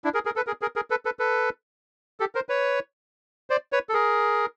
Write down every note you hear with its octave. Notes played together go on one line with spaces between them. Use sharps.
D4 E4
G#4 A#4
G#4 A#4
A4 B4
G#4 A#4
G#4 A#4
G#4 A#4
A4 B4
A4 B4
A4 B4
G4 A4
A#4 C5
B4 C#5
C5 D5
B4 C#5
A4
G#4 A#4